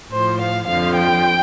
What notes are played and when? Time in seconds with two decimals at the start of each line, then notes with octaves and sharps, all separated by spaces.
0.12 A2 F3 C5
0.41 F5
0.68 F2 D3 F3 F5
0.97 G5